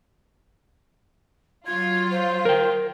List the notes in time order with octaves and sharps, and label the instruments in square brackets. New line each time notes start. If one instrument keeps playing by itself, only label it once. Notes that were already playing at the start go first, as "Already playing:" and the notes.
[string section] F#3 F4 [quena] G#6
[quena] C5
[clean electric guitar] A#4 G5